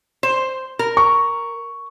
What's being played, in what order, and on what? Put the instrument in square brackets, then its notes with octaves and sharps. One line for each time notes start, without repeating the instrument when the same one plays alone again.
[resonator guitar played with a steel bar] C5
A#4
[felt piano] C#6